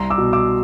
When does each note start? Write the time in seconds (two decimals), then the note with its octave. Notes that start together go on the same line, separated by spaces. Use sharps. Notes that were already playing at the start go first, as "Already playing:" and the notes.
Already playing: C2 A#5 C6
0.10 D6 E6
0.18 B2
0.33 D6 E6